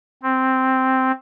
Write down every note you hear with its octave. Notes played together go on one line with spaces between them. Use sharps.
C4